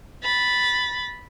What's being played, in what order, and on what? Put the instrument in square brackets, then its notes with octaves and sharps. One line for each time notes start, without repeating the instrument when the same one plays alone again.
[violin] B5 A6